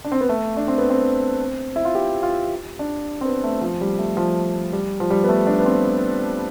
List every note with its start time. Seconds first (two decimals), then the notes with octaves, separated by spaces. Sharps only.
0.04 D4
0.12 C4
0.21 B3
0.29 A3
0.57 D4
0.68 C4
0.78 B3
0.90 C4
1.76 E4
1.85 F4
1.95 G4
2.23 F4
2.79 D4
3.21 C4
3.25 B3
3.44 A3
3.61 F3
3.81 G3
3.99 A3
4.17 F3
4.73 G3
5.00 F3
5.10 G3
5.24 B3
5.29 A3
5.47 D4
5.60 B3
5.66 C4